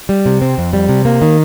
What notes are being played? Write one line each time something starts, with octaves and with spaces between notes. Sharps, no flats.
G3
C3
C4
F2
G3
C3
A#3
D#3